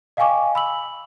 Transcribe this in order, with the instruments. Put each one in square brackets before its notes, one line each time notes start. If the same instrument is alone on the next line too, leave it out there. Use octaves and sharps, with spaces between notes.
[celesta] D#5 F5 G5 G#5 C#6 D6
B5 E6 F#7